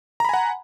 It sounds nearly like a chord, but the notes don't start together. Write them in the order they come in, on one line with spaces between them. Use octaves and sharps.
A#5 B5 G#5 F#5